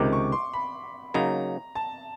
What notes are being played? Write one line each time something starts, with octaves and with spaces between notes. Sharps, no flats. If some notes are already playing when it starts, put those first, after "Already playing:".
Already playing: C#2 C3 D#3 D6
C#6
C6
B5
C#3 F#3 A#3 D#4 A#5
A5